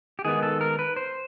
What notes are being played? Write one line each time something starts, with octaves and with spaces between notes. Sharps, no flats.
G4
D#3 G#3 B3 G#4
A4
A#4
B4
C5